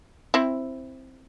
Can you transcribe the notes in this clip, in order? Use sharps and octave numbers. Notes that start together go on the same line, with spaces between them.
C4 E4